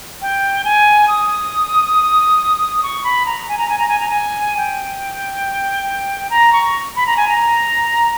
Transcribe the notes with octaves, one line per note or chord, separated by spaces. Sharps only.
G5
G#5
D#6
C#6
B5
A#5
G#5
A#5
G#5
A#5
G#5
A#5
G#5
G5
A#5
C#6
B5
A#5
G#5
A#5